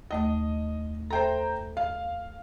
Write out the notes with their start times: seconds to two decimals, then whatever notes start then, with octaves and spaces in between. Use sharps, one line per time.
0.11 D#2 A3 D#5 D#6
1.11 A4 C5 E5 G5 A#5
1.77 F5